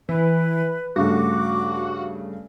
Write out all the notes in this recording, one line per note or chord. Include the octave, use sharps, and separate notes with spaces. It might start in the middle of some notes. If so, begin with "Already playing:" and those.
E3 B4
G2 C#3 A3 F#4 D6